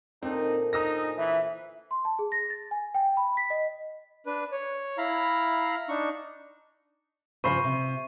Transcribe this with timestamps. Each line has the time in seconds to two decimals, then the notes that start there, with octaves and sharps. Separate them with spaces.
0.23 A#2 D3 F3 C4 D#4
0.73 D#4 G#4 D#6 E6 A#6
1.18 E3 E5
1.91 C6
2.05 A5
2.19 G#4
2.32 A#6
2.50 A6
2.71 G#5
2.94 G5
3.17 B5
3.37 B6
3.50 D#5
4.26 D4 B4
4.52 C#5
4.98 E4 F5 A#5 B5
5.89 D4 D#4 C#6
7.44 G2 C#3 F3 C5 B5 C#6 C7
7.64 C3